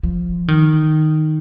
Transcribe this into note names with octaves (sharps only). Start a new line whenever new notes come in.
F3
D#3